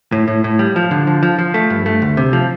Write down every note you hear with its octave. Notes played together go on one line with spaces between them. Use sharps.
A2
A2
A2
G3
F3
D3
F3
F3
F3
A3
G2
A3
D2
C3
F3